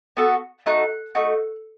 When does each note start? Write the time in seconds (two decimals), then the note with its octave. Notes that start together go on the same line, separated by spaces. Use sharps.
0.17 B3 F#4 A4
0.66 A3 D#4 F#4 F#6
1.15 A3 D#4 F#4